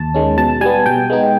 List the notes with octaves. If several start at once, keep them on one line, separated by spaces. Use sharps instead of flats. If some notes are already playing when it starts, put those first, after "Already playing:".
Already playing: D#2 A5
D#3 G#3 C#4
B2 A5
G3 B3 G#5
B2 G5
G#3 B3 D#4